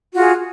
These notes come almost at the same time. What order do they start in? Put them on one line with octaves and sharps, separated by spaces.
F#4 F4 G#4